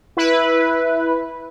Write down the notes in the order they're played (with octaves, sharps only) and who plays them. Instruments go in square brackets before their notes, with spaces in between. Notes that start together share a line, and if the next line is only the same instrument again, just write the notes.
[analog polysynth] E4 B4